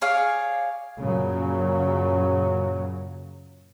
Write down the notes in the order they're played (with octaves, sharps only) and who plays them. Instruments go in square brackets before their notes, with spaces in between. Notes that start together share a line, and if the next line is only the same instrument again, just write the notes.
[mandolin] G#4 C#5 D5 F5
[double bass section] F#2 A#2 C#3 [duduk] F#3